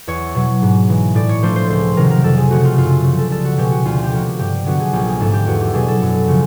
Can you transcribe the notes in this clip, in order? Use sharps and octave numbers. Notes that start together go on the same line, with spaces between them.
E2 C#5
B2 F#3
G#2
E3 G#3
A2 D5
C#5
F3 A3 D4 C5
C5
C#2 C5
C3 D#3 F#3 A#4
A#4
F2 A4
G#4
C#3 F3 A3 F#4
F4
F#2 F4
C#3 F3
A4
C2 A4
F#4
B2 G#3 C#4 G4
F#4
D2 F4
G4
C3 F3 A#3 F#4
G2 G4
D3 F#3 B3 D4 F#4
G#4
A#1 G4
G#4
G#2 F3 A3 A4
G4
E2 F#4
G4
B2 F#3 B3 D4 G#4
A4
F#2
C#3 F3